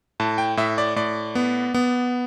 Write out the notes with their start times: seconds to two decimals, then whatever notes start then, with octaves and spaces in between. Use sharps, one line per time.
0.20 A2 A5
0.38 G5
0.57 A2 E5
0.78 D5
0.96 A2 D5
1.35 B3
1.74 B3